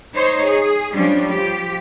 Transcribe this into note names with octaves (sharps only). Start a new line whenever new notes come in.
D#4 C5 C#5
G#4
F3 G3 C#4 D4
F3 G4